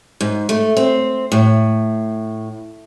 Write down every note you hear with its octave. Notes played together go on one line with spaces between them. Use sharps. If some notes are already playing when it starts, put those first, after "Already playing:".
G#2
A3
C4
A2